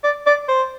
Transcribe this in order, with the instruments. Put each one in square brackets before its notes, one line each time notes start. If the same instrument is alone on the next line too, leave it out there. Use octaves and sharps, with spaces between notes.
[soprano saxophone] D5
D5
C5